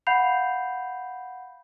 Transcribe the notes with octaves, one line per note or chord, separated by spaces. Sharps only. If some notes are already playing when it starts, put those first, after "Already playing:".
F5 F#5 B5 G6 C7 F7